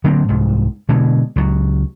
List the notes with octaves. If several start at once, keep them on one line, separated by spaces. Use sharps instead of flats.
D3 F#3 A#3 C4
C2 G#2
B2 D3 G#3
C#2 F#3